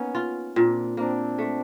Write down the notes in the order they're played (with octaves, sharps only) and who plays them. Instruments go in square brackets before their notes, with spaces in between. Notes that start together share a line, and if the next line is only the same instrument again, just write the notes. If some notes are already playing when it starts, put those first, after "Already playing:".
Already playing: [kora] A#3 D#4 [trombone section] B3 C#4
[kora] F4
[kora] A#2 [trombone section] C4 D4
[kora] A#3 [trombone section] C4 D4
[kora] A3